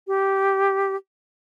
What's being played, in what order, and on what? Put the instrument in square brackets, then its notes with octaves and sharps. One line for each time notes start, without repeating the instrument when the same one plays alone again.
[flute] G4